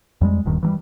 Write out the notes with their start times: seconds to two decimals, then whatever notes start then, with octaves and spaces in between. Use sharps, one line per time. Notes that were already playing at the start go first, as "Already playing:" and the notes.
0.21 F2 G3 G#3
0.45 D#1 G2 D#3
0.63 E3 F#3 G3